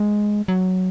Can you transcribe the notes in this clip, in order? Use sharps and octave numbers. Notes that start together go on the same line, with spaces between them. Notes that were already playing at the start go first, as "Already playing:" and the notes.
Already playing: G#3
F#3